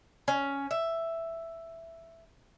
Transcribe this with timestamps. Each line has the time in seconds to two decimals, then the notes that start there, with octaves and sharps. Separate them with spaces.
0.28 C#4
0.71 E5